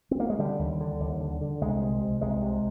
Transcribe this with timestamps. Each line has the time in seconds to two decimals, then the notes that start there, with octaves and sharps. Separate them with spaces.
0.11 C4
0.20 A#3
0.30 G#3
0.39 D3 G3
0.59 D#2
0.80 D3
1.00 D#2
1.20 D3
1.41 D3
1.61 C2 G#3
1.81 C3
2.01 C3
2.21 C2 G#3
2.42 C3